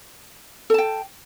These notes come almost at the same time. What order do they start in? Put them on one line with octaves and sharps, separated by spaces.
A4 A5 G5